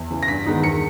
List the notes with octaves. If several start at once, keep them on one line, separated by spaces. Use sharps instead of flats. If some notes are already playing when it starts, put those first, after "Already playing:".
Already playing: E2
C#3 E3
A#6
G2 B6
D#3 G#3 B3 D#4
E2 C#7